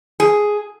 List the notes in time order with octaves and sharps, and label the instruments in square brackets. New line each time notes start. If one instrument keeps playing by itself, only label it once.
[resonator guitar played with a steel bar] G#4